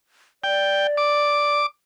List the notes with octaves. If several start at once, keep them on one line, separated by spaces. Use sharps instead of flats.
D5 G5
D6